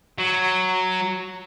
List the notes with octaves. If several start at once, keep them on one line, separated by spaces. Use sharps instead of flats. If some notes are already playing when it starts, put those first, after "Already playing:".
F#3